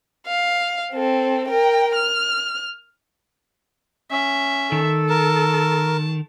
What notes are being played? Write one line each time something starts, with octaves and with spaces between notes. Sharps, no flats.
F5
C4 A4
A#4 G5
F6
C#4 E5
D#3 A4
A#4 A5